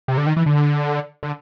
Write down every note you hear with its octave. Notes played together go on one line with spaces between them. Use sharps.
C3
D3
D#3
E3
D3
D3